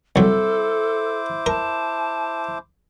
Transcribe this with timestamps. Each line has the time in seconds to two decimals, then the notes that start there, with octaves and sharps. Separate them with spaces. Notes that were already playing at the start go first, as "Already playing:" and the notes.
0.16 C2 F#3 E4 A4 C5 D6
1.46 A#4 A5